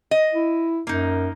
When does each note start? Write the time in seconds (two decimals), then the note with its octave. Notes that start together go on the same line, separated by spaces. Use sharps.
0.11 D#5
0.33 E4
0.87 F#2 A#3 D#4